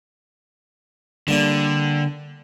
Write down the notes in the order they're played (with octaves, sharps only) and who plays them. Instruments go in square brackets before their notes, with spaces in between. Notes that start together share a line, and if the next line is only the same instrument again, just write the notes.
[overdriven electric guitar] D3 [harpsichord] G3 A#3 D4